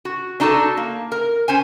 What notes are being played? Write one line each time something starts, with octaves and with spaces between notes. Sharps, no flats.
F#4
D4 D#4 F#4 G#4 A4
A#3
A#4
C#4 C5 G#5